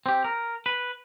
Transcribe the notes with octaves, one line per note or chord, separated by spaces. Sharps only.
C4 G4
A#4
B4